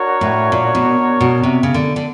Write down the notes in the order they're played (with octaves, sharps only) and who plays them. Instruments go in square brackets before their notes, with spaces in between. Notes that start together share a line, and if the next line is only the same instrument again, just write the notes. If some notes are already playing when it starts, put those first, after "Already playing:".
Already playing: [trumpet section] D4 F#4 A#4 C#5
[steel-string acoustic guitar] A2
A#2
B2
B2
C3
C#3
D3
D3